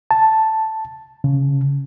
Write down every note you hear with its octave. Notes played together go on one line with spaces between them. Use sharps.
A5
C#3